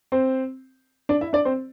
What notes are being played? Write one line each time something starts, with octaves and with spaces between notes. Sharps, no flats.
C4 C5
D4 D5
E4 E5
D4 D5
C4 C5